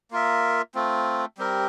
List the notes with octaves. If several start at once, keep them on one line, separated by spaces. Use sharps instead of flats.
A#3 F4 A#4 E5
A3 C4 F4
G3 C4 G4 A#4